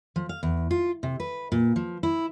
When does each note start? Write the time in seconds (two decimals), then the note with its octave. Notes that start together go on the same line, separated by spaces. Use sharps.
0.16 F3
0.29 F5
0.43 E2
0.71 F4
1.03 C3
1.20 B4
1.52 A#2
1.76 F3
2.03 E4